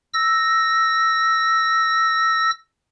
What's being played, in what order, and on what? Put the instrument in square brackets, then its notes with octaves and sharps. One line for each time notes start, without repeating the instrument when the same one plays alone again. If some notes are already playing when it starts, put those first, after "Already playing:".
[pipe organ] E6 A#6